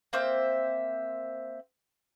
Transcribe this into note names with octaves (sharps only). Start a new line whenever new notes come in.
A#3 C4 C5 E5